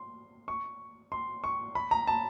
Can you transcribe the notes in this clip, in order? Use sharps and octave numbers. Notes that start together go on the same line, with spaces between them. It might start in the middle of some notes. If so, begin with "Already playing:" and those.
Already playing: C6
C#6
C6
C#6
B5
A#5
A5